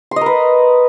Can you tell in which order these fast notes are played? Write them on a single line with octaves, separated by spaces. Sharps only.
C6 D#5 A#4 B4